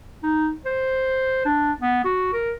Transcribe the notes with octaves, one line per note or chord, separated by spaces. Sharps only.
D#4
C5
D4
B3
F#4
A#4